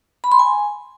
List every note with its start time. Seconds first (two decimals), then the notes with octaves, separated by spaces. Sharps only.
0.24 B5
0.32 C6
0.39 G#5